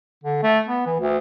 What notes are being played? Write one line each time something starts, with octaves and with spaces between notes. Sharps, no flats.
D3
A3
B3
E3
D2